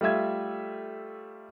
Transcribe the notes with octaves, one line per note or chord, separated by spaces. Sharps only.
G3 A3 F4 E5 G#6